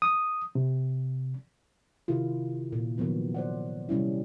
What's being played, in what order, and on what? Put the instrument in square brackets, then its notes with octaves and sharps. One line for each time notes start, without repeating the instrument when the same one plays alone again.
[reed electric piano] D#6
C3
[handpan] C3 D#3 E4 F4
A#2
D#3 F3 F#3 B3
C5 D5 F#5
C3 G3 C#4 E4